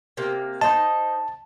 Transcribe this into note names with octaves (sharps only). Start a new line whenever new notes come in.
C3 A#3
D#4 C5 D#5 A5